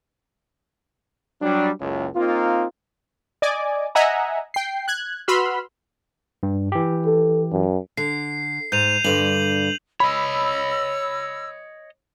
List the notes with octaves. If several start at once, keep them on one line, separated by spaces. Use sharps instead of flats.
F#3 G3 D4
F#1 C#2
A#3 C4 D#4 F4
D5 D#5 G#5 D6
D#5 E5 F#5 G#5 A#5
G5 C7
F#6 G#6
F#4 B4 B5 C6 E6 F6
G2
E3 G4
A4
F#2
D3 C7
G#2 G6 D#7 F7
G2 D3 D5 F#7
C#5 D#5 B5 E6